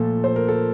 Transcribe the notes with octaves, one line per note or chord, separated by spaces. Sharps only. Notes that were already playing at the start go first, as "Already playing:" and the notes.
Already playing: A#2 F3 A3 A4
C5
A#4
A4